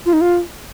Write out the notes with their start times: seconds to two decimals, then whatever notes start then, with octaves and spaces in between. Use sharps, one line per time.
0.06 F4
0.13 D#4
0.21 F4